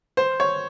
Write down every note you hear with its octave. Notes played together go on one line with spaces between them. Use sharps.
C5
C#5